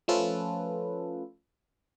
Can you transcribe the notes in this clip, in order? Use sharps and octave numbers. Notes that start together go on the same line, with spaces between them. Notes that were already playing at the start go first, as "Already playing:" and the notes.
F3 A3 C#4 F4 A4 B4